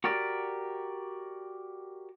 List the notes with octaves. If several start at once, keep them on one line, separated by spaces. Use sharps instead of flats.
F#4 G4 A#4 D5